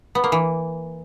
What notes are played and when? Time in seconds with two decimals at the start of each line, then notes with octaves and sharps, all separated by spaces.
0.15 B3
0.24 A#3
0.32 E3